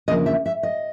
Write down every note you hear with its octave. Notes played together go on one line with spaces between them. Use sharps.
E2 C#3 F3 A#3 D4 D#5
E5
E5
D#5